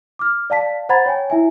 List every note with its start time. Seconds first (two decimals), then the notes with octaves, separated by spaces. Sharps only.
0.19 D6 F6
0.50 D5 F5 A5 B6
0.89 C5 F#5 A#5 B5 G#6 A6
1.06 C#5 G5 G#5
1.30 E4 E5 G#5